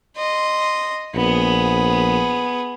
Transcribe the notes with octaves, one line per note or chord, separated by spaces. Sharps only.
D#5 C6
A#1 B3 G#4